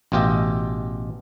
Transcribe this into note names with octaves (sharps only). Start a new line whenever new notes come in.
A1 B2 F4 G4 D#5 E5